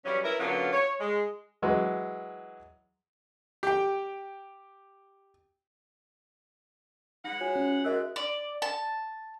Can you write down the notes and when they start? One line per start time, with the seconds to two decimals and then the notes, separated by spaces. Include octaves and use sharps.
0.05 E3 F#3 G3 C#4
0.24 E4 A#4 B4
0.39 D3 F#3 A#3 B3 C#4 F4
0.73 C#5
1.00 G#3
1.62 E3 F#3 G#3
3.63 G4 G5
7.24 G#3 D#4 B4 F#5 A#6 C#7
7.40 F4 F#4 C#5 G#5
7.56 C#4
7.84 G#2 F#4 A#4 D#5 E5 E6 F#6
8.16 D5
8.62 A5